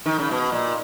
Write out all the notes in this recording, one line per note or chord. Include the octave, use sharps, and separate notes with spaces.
D#3
C#3
B2
A#2